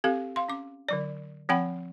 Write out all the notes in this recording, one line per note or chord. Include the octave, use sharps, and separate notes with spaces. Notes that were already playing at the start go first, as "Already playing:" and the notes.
C4 G4 A4 F5
F5 C6
C#4 D6
D3 F#3 D5
F3 C4 F#5 G5 B5